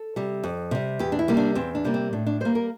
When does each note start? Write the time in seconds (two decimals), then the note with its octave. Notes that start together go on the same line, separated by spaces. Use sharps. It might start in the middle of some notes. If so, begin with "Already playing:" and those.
Already playing: A4
0.16 C3 G3
0.44 F2
0.71 C3 G3
0.99 E2 G4
1.12 D4
1.19 E4
1.28 C3 G3 A#3
1.37 D4
1.55 E2 C4
1.75 D4
1.84 C3 G3 A#3
1.94 C4
2.13 A2 D4
2.27 D4
2.40 G3 A#3 C5
2.55 A#4